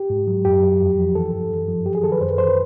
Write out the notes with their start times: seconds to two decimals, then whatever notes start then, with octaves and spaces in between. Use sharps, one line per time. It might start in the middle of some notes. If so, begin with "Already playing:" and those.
Already playing: G4
0.10 G#2
0.27 F#3
0.45 F#2 G4
0.63 F#3
0.80 F2
0.98 F3
1.15 E3 A4
1.33 G2
1.50 F#2
1.68 F3
1.86 F#3 G4
1.95 G#4
2.04 D#3 A4
2.12 B4
2.21 F#2 C5
2.30 B4
2.38 E3 C5
2.47 B4